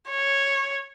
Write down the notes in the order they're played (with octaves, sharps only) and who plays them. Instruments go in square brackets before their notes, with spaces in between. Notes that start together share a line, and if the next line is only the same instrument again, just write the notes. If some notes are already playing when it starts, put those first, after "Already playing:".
[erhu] C#5